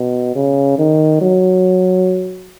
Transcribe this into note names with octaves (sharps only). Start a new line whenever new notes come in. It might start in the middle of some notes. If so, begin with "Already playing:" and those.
Already playing: B2
C#3
D#3
F#3